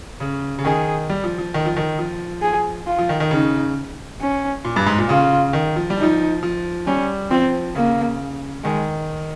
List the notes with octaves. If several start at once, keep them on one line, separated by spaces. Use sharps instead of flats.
C#3
C#3
D#3 G#4
G3
F3
F3
D#3
F3
D#3
F3
G#4
F4
F3
D#3
D#3
C#3 D#4
C#4
A#2
G2
G#2
A#2
C#3 F4
D#3
F3
G3
F3 D#4
F3
G3 C#4
F3 C4
C#3 A#3
D#3 G#3